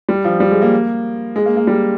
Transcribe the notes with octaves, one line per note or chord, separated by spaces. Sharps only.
G3
F3
G3
G#3
A#3
G#3
A#3
A#3
G3